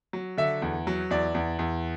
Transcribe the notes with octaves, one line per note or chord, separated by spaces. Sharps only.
F#3
D3 E5
E2
F#3
E2 D5
E2
E2